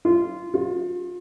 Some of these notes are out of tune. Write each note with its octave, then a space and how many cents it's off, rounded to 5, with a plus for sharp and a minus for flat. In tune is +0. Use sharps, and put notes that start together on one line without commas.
F4 -15
F4 +35